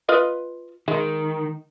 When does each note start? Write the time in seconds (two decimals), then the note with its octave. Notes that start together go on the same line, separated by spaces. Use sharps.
0.09 F4 B4 D#5
0.88 D#3 G#3